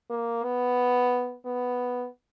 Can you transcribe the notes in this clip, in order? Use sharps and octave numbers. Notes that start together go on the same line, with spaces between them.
A#3
B3
B3